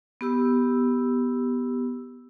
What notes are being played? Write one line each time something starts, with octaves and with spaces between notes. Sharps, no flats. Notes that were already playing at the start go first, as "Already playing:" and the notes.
B3 G4 E6